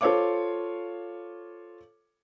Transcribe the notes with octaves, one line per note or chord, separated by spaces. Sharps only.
F4 A4 C5 C#5 F5 D6